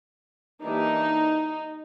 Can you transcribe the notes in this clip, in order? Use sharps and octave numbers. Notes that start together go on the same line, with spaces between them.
E3 G3 A#3 D4 D#4